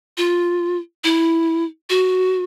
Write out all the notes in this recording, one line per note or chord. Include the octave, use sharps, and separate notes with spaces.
F4
E4
F#4